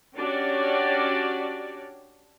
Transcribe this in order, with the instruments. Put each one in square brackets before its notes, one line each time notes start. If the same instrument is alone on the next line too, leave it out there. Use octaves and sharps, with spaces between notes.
[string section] C#4 D4 F#4 G4 C#5 D5